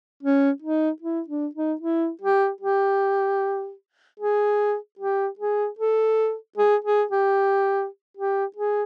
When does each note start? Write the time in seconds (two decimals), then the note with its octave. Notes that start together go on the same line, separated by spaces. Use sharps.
0.23 C#4
0.62 D#4
1.02 E4
1.28 D4
1.55 D#4
1.81 E4
2.21 G4
2.61 G4
4.20 G#4
4.99 G4
5.39 G#4
5.79 A4
6.58 G#4
6.85 G#4
7.11 G4
8.17 G4
8.56 G#4